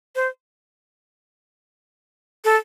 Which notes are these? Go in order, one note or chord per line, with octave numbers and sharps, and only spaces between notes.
C5
A4